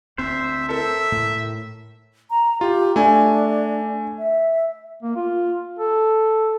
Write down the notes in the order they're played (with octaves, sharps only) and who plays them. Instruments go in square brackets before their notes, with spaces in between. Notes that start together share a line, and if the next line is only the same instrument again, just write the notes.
[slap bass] D2 C4 [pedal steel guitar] C5 [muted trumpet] E5
[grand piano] A4 A#4 [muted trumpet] E5
[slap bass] A2
[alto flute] A#5
[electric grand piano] F4 [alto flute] G4
[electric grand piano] A3 G#5 [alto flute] D4
[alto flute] E5
[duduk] A#3
F4
A4